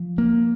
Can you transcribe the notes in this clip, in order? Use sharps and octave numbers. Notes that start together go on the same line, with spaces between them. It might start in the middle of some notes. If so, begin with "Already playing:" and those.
Already playing: F3
A#3